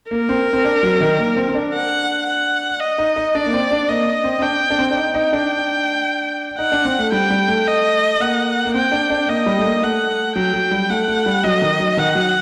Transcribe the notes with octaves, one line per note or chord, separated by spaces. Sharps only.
A#3 A#4
C4
C4
D4
F#3
D#3
A#3
C4
C4
D4
F#5
F#5
D#5
D#4
D#4
D4 D5
A#3
C4
D4
A#3 D#5
C4
C4
D4 G5
D4
C4
D4
D#4 G5
D#4
D4
D#4 F#5
D4
C4
A3
G3 G5
G3
A3
D#5
A#3 F#5
A#3
C4 G5
D4
D4
A#3 D#5
G3
A3
A#3
A3 F#5
F#3 G5
F#3
G3
A3 F#5
A3
G3
F#3 D#5
D#3
F#3
D#3 F#5
F#3